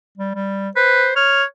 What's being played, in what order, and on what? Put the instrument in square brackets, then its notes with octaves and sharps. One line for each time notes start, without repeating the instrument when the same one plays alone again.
[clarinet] G3
G3
[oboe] B4 [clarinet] C5
[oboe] C#5 [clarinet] F6